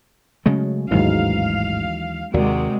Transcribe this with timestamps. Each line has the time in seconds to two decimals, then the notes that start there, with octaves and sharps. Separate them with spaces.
0.46 C#3 F#3 G#3 A3 C#4
0.91 A1 D#2 G#2 E3 F#3 G#3 D#4 F5
2.34 D#2 C3 G#3 F#4 A#4 D5